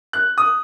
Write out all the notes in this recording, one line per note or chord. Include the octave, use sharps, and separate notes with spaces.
F#6
D#6